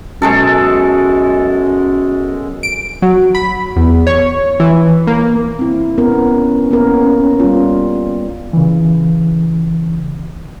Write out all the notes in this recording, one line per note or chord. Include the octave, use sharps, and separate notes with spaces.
F#2 B2 G#3 A4
D7
F#3
B5
E2
C#5
E3
A#3
C4 E4
B3 C#4 A#4
A#3 B3 A#4
G3 F4
C#3 E3